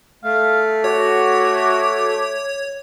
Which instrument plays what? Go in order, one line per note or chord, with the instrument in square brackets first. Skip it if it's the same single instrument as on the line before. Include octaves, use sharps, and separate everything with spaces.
[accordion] A3 [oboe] F5
[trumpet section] F#4 [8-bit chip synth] C#5 [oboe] D6